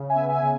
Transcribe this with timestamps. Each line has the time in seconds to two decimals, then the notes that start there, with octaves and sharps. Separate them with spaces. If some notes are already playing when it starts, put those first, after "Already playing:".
Already playing: C#3
0.09 E5 G#5
0.15 B3
0.29 E5 G#5
0.43 C#3